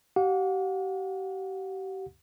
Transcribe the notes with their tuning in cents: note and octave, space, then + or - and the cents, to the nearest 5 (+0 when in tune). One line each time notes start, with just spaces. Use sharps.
G4 -35 F#5 -40